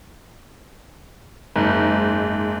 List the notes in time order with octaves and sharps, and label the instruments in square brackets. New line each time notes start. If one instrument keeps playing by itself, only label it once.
[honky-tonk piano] F#1 G#2